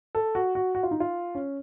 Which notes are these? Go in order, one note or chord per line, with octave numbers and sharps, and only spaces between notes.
A4
F#4
F#4
F#4
F4
D#4
F4
C#4